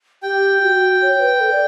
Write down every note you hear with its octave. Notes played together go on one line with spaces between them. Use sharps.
G4 G5
F#4
C#5
B4
A4
D5